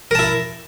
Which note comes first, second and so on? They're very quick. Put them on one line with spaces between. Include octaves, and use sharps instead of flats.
A#4 A5 E4